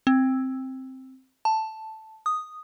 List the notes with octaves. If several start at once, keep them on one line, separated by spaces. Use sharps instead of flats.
C4
A5
D#6